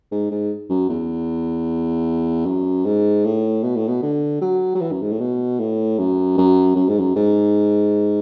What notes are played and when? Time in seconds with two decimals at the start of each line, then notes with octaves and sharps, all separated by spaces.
0.11 G#2
0.31 G#2
0.70 F#2
0.89 E2
2.46 F#2
2.85 G#2
3.25 A2
3.63 B2
3.75 A2
3.88 B2
4.02 D3
4.41 F#3
4.75 F#3
4.81 E3
4.92 F#2
5.01 G#2
5.11 A2
5.20 B2
5.59 A2
5.99 F#2
6.38 F#2
6.76 F#2
6.88 G#2
6.99 F#2
7.15 G#2